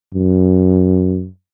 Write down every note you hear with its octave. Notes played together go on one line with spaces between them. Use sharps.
F#2